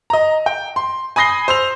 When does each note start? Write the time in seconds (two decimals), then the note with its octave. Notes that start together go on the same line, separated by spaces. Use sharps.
0.10 D#5 A#5
0.46 G5
0.76 C6
1.16 G#5 B5 D#6 A#6 C7 G7
1.48 C5 E6 F7